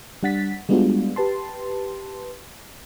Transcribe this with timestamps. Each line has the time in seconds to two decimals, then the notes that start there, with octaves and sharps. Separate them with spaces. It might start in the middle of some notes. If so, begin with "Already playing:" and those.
0.23 G3 D4 F#5 A6 B6
0.69 G3 G#3 B3 D4 F4 F#4
1.16 G4 B4 A5 C6